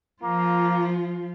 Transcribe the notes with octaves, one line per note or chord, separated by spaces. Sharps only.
F3 A#3 F4